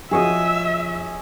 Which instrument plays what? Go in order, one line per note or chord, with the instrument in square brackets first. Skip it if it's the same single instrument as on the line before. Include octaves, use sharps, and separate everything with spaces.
[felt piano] F3 F#4 [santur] G#4 C#5 D#5 [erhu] E5